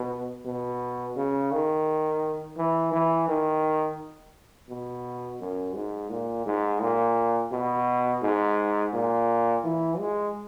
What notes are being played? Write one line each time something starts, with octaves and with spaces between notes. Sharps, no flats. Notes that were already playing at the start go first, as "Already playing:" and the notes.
Already playing: B2
B2
C#3
D#3
E3
E3
D#3
B2
F#2
G#2
A#2
G#2
A#2
B2
G#2
A#2
E3
G#3